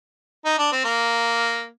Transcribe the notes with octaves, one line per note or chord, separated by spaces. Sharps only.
D#4
D4
C4
A#3